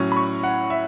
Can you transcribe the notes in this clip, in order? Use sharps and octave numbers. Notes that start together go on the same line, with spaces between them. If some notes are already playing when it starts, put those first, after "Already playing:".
Already playing: A2 F#3 C#4
B5
C#6
F#5
E5